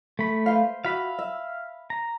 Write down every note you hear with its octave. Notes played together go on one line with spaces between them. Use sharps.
A3 B5
B4 C5 F5
F#4 E5 F5 B5
E5
A#5